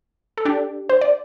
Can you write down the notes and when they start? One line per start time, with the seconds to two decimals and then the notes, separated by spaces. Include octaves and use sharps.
0.37 A4
0.45 D4 G4
0.89 C5
1.01 D5